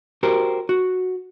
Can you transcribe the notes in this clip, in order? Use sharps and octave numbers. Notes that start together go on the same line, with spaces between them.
F#4 G4 A#4 C5
F#4